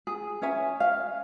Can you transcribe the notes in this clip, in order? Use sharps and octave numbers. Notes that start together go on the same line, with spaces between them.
G#4
C#4 C#5 E5 G#5
F5